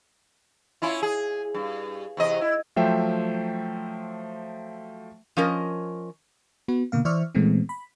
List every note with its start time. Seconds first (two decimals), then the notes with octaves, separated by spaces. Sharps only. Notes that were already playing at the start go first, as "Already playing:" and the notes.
0.82 C#4 E4 F4
1.02 G#4
1.54 G2
2.17 E2 C3 D#5
2.41 E4
2.76 F3 F#3 A3 C5 E5 G5
5.37 F3 C#4 A#4 D#5
6.68 B3 F#4 B4
6.92 B2 D3 A#3 F5
7.05 E3 C5 D5 E5 C#6 F6
7.35 A#2 E3 G#3 A3 B3 C4
7.69 B5